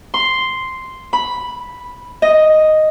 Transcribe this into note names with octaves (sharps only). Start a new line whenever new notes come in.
C6
B5
D#5